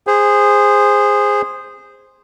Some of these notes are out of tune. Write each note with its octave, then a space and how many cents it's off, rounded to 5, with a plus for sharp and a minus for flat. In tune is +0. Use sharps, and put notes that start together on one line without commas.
G#4 -15 C5 +0